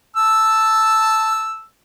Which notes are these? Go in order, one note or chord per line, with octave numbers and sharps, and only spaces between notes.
A5 E6